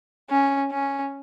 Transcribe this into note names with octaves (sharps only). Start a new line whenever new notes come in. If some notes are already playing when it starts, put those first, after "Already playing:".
C#4
C#4